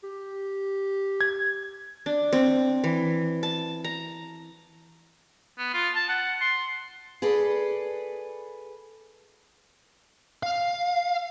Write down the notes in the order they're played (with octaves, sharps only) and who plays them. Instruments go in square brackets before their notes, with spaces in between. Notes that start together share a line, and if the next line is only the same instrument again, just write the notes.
[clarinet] G4
[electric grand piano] G#6
[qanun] D4
C4
E3
A5
A#5
[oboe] B3
F4
A5
F#5
C6
[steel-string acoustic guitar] G#4 A4 B4 D5
[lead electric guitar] F5